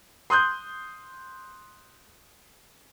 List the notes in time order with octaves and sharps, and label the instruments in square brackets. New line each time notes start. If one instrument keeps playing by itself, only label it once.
[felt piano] C6 D#6 F#6 G6